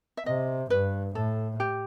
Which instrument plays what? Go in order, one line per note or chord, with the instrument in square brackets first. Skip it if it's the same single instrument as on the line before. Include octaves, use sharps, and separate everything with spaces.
[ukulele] E5
[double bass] C3 [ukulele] D#5
[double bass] G2 [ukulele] B4
[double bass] A2 [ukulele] A4
[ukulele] G4